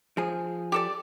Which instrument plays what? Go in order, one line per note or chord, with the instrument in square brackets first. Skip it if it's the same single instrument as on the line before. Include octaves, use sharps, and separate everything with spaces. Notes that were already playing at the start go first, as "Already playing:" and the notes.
[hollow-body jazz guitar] F3 G#4
[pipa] G4 A4 D5